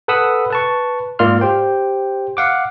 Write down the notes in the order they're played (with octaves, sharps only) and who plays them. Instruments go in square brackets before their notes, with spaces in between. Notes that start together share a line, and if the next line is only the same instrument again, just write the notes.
[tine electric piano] A4 B4 F#5 B5 D#6 E6
B4 A5 C#6
G#2 A#3 F4 D5 C6 F6
G4 C5 G5
F5 F#5 D6